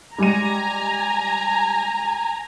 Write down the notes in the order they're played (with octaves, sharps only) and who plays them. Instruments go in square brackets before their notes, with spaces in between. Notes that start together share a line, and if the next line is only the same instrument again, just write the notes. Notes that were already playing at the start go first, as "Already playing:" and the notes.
[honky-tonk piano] G3 G#3 D#7 [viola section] G#5 A#5